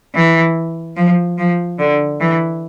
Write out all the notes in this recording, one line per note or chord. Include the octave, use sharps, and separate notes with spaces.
E3
F3
F3
D3
E3